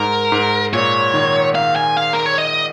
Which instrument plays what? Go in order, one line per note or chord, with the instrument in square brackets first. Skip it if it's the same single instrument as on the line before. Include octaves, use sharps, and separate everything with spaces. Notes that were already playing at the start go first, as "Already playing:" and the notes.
Already playing: [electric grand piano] G#2 [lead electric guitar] A#4
[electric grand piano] G#2
[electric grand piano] A#2 [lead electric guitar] C#5
[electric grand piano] D#3
[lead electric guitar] F5
G#5
F5
A#4
C#5
D#5